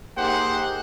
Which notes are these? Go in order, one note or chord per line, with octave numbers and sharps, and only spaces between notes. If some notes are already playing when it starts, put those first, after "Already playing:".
A#3 D#4 G4 G#4 C5 F#5